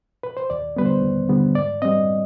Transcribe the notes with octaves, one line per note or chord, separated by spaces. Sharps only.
B4
C5
D#2 D5
D3 G3 B3 B4
C5
D#2
D3 G3 B3
G#2 D5
G3 C4 D#5